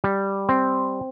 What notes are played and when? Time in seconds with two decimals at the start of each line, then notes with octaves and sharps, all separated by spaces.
0.04 G3
0.49 C4